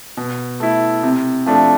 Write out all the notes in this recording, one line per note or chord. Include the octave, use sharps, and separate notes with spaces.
B2
A3 E4
C3
F3 A3 D4